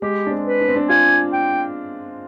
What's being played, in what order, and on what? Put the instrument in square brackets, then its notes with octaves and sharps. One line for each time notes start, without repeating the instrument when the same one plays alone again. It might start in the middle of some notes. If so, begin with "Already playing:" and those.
[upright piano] G#3 [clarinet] G4
[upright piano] D4
C4
[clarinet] B4
[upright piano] D4
C4
D4
[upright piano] F4 [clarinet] G#5
[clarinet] G5